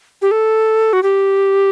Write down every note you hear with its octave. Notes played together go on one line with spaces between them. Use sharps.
G4
A4
F#4
G4